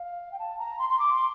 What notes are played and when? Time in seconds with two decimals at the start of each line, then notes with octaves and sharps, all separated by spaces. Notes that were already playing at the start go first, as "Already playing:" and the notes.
Already playing: F5
0.32 G5
0.39 A5
0.59 A#5
0.79 C6
0.89 C6
0.99 D6
1.13 C6